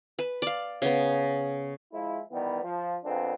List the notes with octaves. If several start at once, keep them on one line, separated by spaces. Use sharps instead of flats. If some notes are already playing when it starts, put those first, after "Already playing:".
B4
D5 F5
C#3 B3
F3 G#3 E4
D#3 E3 G3 B3
F3
A#1 F2 B3 C4 D4